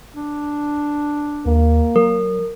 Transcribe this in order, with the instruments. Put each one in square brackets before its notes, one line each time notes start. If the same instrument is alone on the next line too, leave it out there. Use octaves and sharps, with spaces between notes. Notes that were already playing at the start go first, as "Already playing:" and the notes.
[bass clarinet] D4
[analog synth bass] D#2 [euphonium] A#3
[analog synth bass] F#3 [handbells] A#4